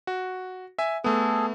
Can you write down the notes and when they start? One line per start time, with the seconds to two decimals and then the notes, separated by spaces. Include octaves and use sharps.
0.07 F#4
0.78 E5 G#5
1.04 A3 B3 G#4 A4